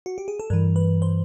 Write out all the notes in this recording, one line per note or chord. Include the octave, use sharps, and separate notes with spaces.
F#4
G4
G#4
A4
G2 E3 A#4
B4
C5